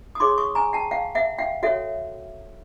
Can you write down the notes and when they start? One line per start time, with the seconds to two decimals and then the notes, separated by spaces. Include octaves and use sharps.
0.15 D#6
0.20 D#4 G#4 C#5 C6 D6
0.38 C#6 D#6
0.55 G#5 A#5
0.73 G5 A5
0.91 F5 G5
1.15 E5 F#5
1.38 F5 G5
1.63 F#4 A4 C#5 E5 F#5